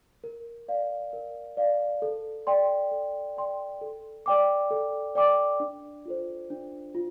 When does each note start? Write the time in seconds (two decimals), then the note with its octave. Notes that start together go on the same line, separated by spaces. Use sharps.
0.24 A#4
0.68 D5 F5
1.13 A#4
1.57 D5 F5
2.02 A4
2.47 D5 G5 C6
2.91 A4
3.37 D5 G5 C6
3.82 A4
4.26 D5 G5 D6
4.71 A4
5.15 D5 G5 D6
5.60 D4
6.06 F4 A4 C5
6.50 D4
6.95 F4